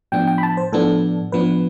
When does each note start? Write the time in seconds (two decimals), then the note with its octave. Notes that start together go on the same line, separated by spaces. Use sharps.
0.12 A2 F3 B3 D4 G5
0.28 G5
0.38 B5
0.43 A5
0.57 C5
0.72 A2 F3 B3 D4 A4
1.32 A2 F3 B3 D4 B4